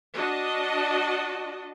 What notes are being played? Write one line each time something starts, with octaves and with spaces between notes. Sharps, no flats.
D4 F#4 D#5 A5